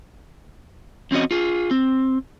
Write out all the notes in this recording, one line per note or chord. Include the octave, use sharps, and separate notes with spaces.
E2 C4 C#4 F#4 D#5
F4 G#4
C4